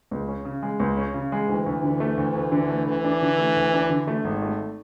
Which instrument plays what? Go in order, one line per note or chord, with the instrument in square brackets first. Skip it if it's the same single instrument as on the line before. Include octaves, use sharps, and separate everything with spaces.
[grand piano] C#2
C#4
C#3
G#3
C#2
C#4
C#3
G#3
[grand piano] D2 [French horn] E3
[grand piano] D2
D3
A3
D2
D2
D3
A3
[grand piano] D2 [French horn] E3
[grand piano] D4
D3
A3
D2
D4
D3
A3
G#1
A3